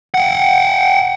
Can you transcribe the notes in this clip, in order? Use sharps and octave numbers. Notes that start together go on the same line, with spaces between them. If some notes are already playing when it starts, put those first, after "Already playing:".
F#5 G5